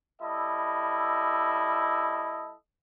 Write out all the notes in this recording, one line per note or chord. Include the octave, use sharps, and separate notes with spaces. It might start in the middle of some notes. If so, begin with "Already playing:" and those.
G3 E4 A4 D#5